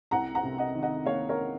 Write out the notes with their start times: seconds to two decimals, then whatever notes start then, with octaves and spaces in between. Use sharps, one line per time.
0.11 C2 F#5 A#5
0.35 F#5 A#5
0.43 C3
0.58 D#5 F#5
0.75 D#3
0.82 D#5 F#5
1.06 A#3 C#5 F5
1.29 A#4 C#5